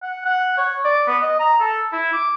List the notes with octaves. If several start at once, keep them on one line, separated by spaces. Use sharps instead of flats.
F#5
F#5
C#5
D5
B3
D#5
A#5
A4
E4
D6